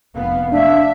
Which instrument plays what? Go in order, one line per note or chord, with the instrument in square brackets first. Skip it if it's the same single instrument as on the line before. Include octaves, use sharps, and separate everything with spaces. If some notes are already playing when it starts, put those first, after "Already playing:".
[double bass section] F1 B3 [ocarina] F5
[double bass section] A3 [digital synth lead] D4 [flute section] E5